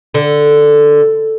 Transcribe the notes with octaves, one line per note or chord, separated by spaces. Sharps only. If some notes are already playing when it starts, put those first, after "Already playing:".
D3